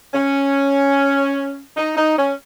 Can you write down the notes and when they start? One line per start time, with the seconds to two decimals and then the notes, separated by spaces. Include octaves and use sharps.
0.14 C#4
1.76 D#4
1.97 D#4
2.17 C#4